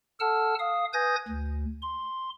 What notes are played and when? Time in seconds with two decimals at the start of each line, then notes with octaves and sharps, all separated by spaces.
0.20 A4 F#5 A5 E6 F6
0.59 F5 D#6
0.93 B4 G#5 D#6 G6 G#6 A#6
1.28 D2
1.82 C6